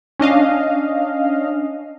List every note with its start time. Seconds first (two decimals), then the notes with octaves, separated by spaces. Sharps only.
0.19 C#4 D4 D#5 F5